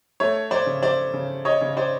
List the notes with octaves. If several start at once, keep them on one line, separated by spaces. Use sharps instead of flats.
A3 C#5
C5 D5
C#3
C5 D5
C#3
C#5 D#5
C#3
C5 D5